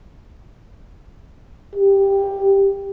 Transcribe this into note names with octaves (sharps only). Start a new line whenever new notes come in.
G4